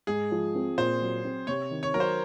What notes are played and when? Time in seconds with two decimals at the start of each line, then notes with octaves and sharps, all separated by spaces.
0.07 G#2 G#4
0.31 F3
0.55 C4
0.78 A#2 C5
1.01 F#3
1.25 C4
1.47 C3 C#5
1.71 D#3
1.83 C#5
1.94 F#3 A#4
2.00 C5